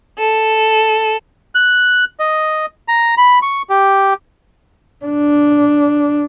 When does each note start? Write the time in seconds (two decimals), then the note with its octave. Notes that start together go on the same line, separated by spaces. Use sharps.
0.18 A4
1.55 F#6
2.20 D#5
2.88 A#5
3.17 B5
3.42 C#6
3.70 G4
5.06 D4